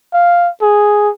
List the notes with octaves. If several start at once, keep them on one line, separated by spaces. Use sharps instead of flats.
F5
G#4